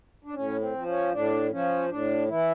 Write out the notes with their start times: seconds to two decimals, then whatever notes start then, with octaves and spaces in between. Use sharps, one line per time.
0.24 D4
0.34 A2 C#4
0.60 C4
0.74 F3
0.86 C#4
1.12 A2 D4
1.51 F3 C#4
1.89 A2 D4
2.28 E3 E4